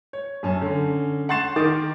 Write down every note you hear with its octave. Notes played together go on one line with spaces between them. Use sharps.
C#5
F#2 C#4 A5
D3 C#4
F#5 C6 C#6 A6 C7 E7
D#3 A#4 D6 D#6 A6